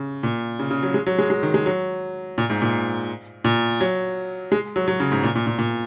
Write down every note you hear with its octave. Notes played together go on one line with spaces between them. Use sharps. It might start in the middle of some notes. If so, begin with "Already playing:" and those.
Already playing: C#3
A#2
C#3
C#3
F#3
G#3
F#3
G#3
G#3
D#3
G#3
F#3
A#2
G#2
A#2
A#2
F#3
G#3
F#3
F#3
C#3
G#2
A#2
A#2
A#2
A#2